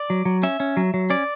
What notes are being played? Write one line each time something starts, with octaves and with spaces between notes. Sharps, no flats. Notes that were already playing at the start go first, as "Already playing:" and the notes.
Already playing: D5
F#3
F#3
C#4 E5
C#4
F#3
F#3
C#4 D5